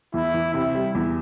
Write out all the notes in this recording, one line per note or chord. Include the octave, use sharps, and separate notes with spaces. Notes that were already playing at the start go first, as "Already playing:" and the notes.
E2 E4
E3
C3 E4
G3
E2